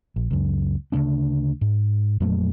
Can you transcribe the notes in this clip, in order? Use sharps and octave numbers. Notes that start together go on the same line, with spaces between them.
A#1
C#2 F#2
D2 C#3 B3 D4
G#2
F2 A#2 F#3 A3